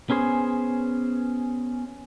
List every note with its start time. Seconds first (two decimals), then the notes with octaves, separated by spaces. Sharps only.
0.10 B3 C#4 G#4 C5